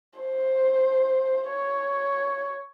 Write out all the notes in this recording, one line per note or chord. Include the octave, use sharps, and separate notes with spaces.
C5
C#5